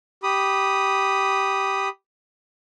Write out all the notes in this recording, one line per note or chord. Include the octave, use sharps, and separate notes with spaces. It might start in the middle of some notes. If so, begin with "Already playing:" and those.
G4 B5 D#6